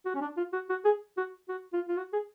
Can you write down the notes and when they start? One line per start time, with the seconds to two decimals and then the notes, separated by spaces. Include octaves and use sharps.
0.06 F#4
0.15 C#4
0.21 D4
0.37 F4
0.53 F#4
0.70 F#4
0.85 G#4
1.17 F#4
1.49 F#4
1.73 F4
1.89 F4
1.97 F#4
2.13 G#4